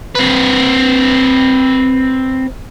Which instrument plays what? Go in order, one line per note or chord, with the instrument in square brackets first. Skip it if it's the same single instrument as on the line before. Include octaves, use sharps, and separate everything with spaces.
[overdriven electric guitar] C4 B4